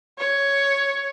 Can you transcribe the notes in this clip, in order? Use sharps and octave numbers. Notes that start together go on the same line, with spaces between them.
C#5